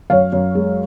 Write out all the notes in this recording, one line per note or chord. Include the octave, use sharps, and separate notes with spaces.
F#2 C#5 F5
F#2
G#3